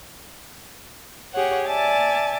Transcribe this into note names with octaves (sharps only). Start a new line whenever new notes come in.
G4 G#4 C#5 F#5
D5 E5 G#5 A5 D6